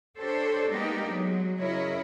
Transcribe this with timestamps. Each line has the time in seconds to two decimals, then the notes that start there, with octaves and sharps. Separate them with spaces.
0.17 D4 G4 A4 C5 C#5
0.70 G#3 A#3 B3 D4 D#4 G4
1.11 F#3 G#3
1.58 C#3 F#3 E4 A#4 C#5 D#5